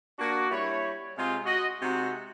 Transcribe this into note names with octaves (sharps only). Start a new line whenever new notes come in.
A#3 D4 F#4
G3 E4 C#5
C3 G#3 F4
F#4 D#5
C3 G#3 D#4 F#4